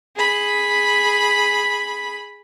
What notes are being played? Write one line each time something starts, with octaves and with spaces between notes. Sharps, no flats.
G#4 B5